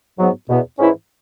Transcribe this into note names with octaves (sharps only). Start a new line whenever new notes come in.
G#2 F#3 B3
E2 B2 B3
G#2 E3 C#4 E4